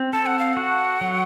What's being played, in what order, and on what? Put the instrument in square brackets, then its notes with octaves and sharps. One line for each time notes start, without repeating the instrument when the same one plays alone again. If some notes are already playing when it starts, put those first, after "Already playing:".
Already playing: [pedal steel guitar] C4
[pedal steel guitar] A4 [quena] A5
[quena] F#5
F5
[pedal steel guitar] F#4 [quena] F#5
[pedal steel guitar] F#3